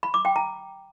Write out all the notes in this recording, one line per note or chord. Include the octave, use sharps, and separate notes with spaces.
B5
D6
G5
A#5